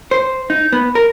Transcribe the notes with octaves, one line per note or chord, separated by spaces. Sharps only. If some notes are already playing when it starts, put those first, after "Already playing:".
C5
D#4
B3
A#4